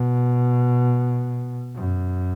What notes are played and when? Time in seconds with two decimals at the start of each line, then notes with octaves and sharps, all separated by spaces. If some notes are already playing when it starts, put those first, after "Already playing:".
Already playing: B2
1.75 F#2